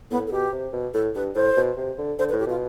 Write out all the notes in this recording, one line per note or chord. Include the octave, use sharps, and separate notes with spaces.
A2 B3
A4
B2 G4
C3
B2
A2 A4
G2 B4
A2 C5
B2
C3
D3
D3 C5
B4
A2
G4
B2 F4